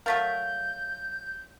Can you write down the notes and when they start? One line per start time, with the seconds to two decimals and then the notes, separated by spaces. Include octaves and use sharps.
0.06 F#3 A3 A#4 F5 G6 A6 B6